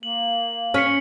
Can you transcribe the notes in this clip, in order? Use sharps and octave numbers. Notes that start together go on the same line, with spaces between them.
A#3 F#7
C#4 F6 B6 C#7